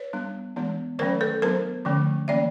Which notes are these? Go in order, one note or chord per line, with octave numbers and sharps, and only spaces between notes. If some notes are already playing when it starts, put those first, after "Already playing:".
Already playing: B4 C#5
G3 B3 D4
E3 G#3 B3 D4
D#3 F#3 A3 C#4 A#4 C5
A4 B4
F#3 B3 D4 A#4 C5
D3 F3 A3 C#4
E3 G3 A#3 C#4 D5 E5